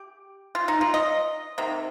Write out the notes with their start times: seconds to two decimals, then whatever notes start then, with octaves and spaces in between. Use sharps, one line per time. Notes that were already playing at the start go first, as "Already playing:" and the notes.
Already playing: G4
0.55 F4
0.68 D#4
0.81 F4
0.94 D#5
1.58 C3 D#3 A#3